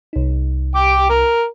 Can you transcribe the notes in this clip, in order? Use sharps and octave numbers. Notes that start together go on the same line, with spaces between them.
C2 D#4
G5 D6
A#4